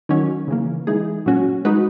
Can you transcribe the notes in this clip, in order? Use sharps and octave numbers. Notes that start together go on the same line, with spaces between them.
D#3 F#3 C#4
C#3 E3 A#3
E3 G#3 D#4 G#4
A#2 F#3 C#4 F#4
G#3 D#4 F#4 B4